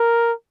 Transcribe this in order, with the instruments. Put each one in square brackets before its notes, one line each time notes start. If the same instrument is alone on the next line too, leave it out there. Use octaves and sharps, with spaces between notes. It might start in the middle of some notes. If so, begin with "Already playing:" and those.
Already playing: [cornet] A#4